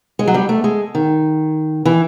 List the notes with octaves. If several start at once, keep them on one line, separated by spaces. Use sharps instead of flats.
G#3
F#3
G3
A3
G#3
D#3
E3